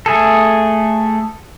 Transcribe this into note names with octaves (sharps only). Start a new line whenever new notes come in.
A3 G#4 A4